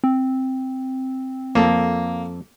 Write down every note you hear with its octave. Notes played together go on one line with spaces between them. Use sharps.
C4
F2 A#3 A4